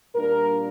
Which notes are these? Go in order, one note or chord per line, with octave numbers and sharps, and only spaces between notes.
A#2 G3 A#3 D4 A#4